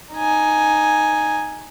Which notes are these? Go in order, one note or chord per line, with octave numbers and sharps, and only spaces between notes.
D#4 G#5